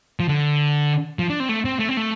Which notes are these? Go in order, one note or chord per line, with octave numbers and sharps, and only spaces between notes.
F3
D3
F3
D4
C4
A3
C4
A3
C4
A3